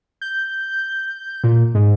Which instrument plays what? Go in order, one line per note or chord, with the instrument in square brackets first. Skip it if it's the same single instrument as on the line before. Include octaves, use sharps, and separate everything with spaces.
[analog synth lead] G6
A#2
G#2